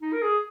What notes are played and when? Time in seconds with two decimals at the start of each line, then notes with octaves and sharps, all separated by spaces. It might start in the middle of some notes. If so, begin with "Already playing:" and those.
0.01 D#4
0.12 A#4
0.22 G#4